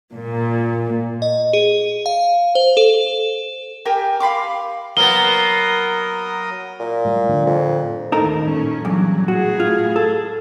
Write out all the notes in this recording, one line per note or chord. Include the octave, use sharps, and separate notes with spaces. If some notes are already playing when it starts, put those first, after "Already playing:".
A#2
D#5
G#4
F5
C5
A4
G4 A#4 G5 G#5
F5 B5 C6 D6
F#3 A#3 B3 A#4 D#6 G7
A#2
A2 G3
A2 D3 F3
F2
D#2 A2 D#4 A4 A#4
A#2 C#4
E2 G2 F#3
A2 F#4 G#4
F4
A4